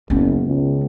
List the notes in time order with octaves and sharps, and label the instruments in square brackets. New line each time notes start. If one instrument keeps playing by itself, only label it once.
[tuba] F#1 [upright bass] B3 C#4
[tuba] C#2